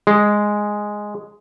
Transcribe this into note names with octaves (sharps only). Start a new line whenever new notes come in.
G#3